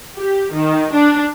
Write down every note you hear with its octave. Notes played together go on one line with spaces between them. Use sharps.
G4
D#3
D4